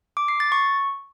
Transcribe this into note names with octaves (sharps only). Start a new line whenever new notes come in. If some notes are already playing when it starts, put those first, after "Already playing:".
D6
C7
A6
C#6